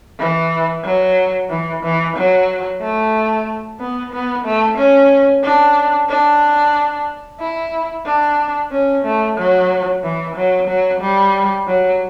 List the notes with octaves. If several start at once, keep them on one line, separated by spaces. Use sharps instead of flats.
E3
F#3
E3
E3
F#3
A3
B3
B3
A3
C#4
D4
D4
E4
D4
C#4
A3
F#3
E3
F#3
F#3
G3
F#3